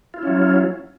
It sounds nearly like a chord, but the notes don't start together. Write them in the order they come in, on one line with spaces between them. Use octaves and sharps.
F4 E4 C#4 F#3